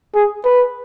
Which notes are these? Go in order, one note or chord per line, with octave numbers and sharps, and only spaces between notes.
G#4
B4